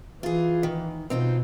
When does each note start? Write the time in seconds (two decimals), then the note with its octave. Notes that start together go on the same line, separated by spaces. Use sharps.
0.23 E3 F4 G#4
0.63 D#3
1.10 B2 C4 D#4 F4